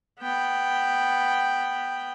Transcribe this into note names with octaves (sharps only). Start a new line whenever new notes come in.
B3 G5